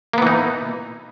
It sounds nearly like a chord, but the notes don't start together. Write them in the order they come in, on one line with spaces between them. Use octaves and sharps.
A#3 B3 E3 D#4